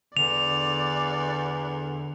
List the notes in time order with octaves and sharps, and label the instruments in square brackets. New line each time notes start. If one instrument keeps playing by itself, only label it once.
[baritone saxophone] E2 [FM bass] D3 [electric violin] D5 [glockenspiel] F7